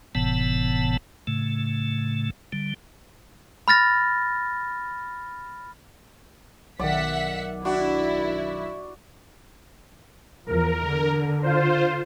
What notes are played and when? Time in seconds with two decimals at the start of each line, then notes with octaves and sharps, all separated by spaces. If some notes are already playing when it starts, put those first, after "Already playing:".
0.15 F#1 A2 C3 E3 B3 A5
1.27 A2 C#3 A3
2.52 D3 G3
3.68 B5 F6 A6 A#6
6.79 B1 D#3 D5 E5 F#5 B6
7.65 D4 E4 F#4
10.47 E2 F3 A#4
10.84 D3
11.43 F4 C5